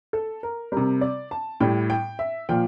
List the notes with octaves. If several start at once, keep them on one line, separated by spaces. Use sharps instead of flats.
A4
A#4
C3 G3 A#4
D5
A5
A2 G3 G5
G5
E5
A#2 F3 G5